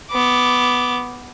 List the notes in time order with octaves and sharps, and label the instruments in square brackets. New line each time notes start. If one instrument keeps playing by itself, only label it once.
[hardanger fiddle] B3 D6